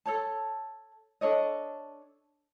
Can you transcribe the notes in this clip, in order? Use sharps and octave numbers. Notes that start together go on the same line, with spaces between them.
A4 C#5 A5
D4 A4 C#5 D#5